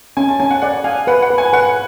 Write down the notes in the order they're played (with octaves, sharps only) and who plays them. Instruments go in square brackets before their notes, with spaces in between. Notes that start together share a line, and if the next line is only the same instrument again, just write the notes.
[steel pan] C#4 [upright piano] G#5
[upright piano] A5
[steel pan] C#4 [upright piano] G#5
[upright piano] F#5
[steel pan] D5 [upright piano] F#5
[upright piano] F5 [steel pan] G#5
[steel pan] B4 [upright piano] F#5
[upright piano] F#5
[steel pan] B4
[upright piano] G#5
[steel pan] B4 [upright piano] F#5